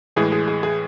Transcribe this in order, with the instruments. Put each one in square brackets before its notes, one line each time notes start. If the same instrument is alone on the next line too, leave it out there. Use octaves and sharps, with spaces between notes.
[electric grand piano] A2 E3 G#3 [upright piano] G#4
[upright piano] G#4
G#4
G#4